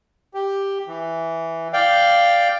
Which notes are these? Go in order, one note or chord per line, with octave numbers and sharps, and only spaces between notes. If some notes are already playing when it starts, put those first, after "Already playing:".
G4
E3
D5 F5 G5